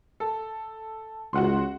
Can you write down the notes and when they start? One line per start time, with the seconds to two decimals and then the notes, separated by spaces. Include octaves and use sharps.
0.20 A4
1.33 C#2 F#4 F#5 C6